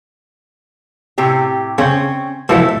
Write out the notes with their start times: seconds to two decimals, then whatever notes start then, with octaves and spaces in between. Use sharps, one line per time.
1.18 A2 C3 G4
1.78 C#3 C4 C#4
2.49 B2 E3 F3 A3 A4 E5